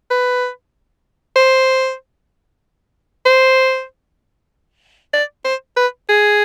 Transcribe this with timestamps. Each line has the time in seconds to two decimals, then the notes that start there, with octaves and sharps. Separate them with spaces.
0.10 B4
1.36 C5
3.26 C5
5.13 D5
5.45 C5
5.77 B4
6.09 G#4